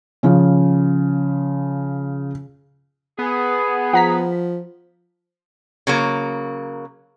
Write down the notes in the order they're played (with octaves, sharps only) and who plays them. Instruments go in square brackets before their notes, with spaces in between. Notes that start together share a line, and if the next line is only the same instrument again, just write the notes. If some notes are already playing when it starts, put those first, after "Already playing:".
[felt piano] C#3 F3 C#4
[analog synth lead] B3 [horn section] G#4
[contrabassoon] F3 [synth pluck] F#5 A#5 B6
[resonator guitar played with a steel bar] C#3 F#3 A#3